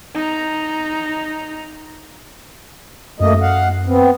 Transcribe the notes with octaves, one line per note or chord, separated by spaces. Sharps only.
D#4 A#5
F#2 A3 A#3 D#5
F5 F#5
B3 C4